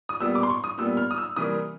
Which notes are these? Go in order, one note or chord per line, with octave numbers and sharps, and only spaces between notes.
D#6
A#2 G3 B3 E6
D6
C6
C#6
D#6
A#2 G3 B3 E6
F6
D#6
E6
C3 E3 G3 A#3 D#6